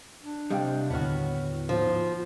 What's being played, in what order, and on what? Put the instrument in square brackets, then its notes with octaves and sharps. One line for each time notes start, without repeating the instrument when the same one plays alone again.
[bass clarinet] D4
[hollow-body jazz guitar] C2 C3 G3 [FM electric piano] D#5 F5 G5
[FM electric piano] D#2 D3 F6 [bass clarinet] A2 [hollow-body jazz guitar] B3 F#4
[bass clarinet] G#2 [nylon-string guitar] F3